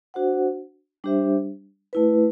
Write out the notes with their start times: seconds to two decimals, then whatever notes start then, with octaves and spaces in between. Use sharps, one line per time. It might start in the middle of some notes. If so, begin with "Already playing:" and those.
0.14 D4 F#4 C5 F#5
1.04 G3 D4 G4 C5 E5
1.93 A3 E4 B4